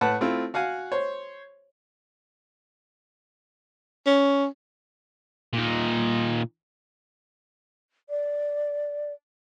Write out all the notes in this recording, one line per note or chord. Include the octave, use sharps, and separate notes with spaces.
A2 B4 F#5 A5
A3 C4 E4 F4
F#4 F5 F#5 G#5
C5 C#5
C#4
A#2 D#4
D5